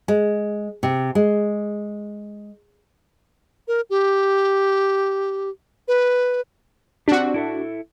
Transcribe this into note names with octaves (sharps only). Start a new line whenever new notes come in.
G#3
C3
G#3
A#4
G4
B4
C4 D4 F#4 G4
E4 A4 E5